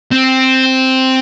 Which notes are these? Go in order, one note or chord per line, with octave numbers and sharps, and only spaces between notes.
C4